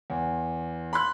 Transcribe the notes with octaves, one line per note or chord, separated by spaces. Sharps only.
E2
B5 C6 F#6